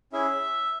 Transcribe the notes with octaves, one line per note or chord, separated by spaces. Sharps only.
C#4 E4 G#4 E5